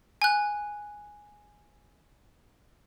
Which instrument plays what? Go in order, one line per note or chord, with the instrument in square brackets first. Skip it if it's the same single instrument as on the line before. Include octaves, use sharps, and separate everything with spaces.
[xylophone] G#5 F#6